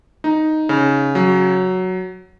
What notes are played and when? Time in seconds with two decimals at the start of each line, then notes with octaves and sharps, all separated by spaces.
0.24 D#4
0.69 C#3
1.15 F#3